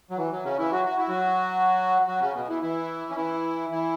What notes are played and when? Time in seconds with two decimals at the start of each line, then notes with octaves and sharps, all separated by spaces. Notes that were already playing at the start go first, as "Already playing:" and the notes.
0.11 F#3
0.17 E3
0.32 F#3
0.44 C#3 C#4
0.59 E3 E4
0.72 F#3 F#4
0.85 F#4
0.97 E4
1.09 F#3 F#4
2.08 F#3 F#4
2.21 C#3 C#4
2.35 B2 B3
2.49 E3 E4
2.62 E3 E4
3.10 C#4
3.16 E3 E4
3.71 E3 E4